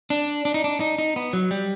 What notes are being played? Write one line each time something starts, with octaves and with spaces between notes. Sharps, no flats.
D4
D4
D#4
D4
D#4
D#4
B3
F#3
G3